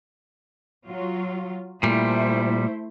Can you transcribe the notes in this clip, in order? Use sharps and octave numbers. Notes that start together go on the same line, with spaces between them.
F#3 F4
A#2 G3 A3 E4 C5